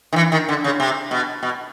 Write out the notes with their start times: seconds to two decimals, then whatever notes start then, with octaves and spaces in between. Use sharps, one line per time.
0.13 D#3
0.16 E3
0.32 D#3
0.49 D3
0.64 C#3
0.80 C3
1.11 B2
1.43 B2